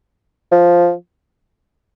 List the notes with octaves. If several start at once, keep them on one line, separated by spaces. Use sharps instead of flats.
F3